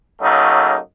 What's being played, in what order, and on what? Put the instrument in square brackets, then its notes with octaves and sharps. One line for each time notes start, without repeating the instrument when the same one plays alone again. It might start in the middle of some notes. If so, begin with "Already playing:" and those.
[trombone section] C#3 F#3 A3 A#3 D#4